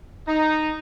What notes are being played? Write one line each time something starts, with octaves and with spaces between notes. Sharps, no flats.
D#4